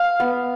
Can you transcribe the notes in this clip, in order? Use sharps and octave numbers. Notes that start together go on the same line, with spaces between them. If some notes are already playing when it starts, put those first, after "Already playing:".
Already playing: F5
B3